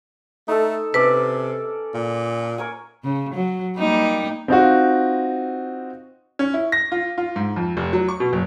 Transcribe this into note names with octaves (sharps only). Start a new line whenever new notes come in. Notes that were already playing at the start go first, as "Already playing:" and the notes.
A3 D#4 A4
C3 C#4 A4 B4 D5
A#2
A#4 C#5 G#5
C#3
F#3
G3 A#3 D#4
C4 D#4 F4 F#4
C#4
E4
A#6
F4
F4
G#2
F2
F1
F#3
C#6
B2
F#1